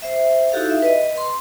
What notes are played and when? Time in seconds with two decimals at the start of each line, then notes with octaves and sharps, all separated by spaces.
0.02 C5 E5
0.52 D#4 E4 F#4 G4 A4 F5
0.70 E5
0.82 B4 D#5
1.18 C6